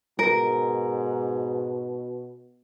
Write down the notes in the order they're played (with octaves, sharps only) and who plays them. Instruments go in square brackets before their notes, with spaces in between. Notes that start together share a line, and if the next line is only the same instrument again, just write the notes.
[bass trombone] G#2 [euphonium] B2 [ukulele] A#4